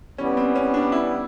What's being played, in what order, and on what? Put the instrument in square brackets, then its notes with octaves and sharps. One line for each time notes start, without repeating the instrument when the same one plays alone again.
[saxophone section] E3 G3 B3 [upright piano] C#4
[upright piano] C4
C#4
D4
E4